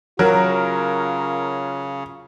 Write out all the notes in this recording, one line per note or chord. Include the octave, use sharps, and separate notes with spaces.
C#3 F#3 F4 A#4